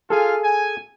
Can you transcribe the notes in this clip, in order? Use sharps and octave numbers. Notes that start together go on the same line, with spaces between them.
F4 G#4 A4 F5 G#5
G#5